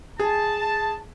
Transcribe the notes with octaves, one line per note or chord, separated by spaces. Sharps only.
G#4 A5